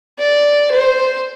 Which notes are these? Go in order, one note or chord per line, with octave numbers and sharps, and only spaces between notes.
D5
C5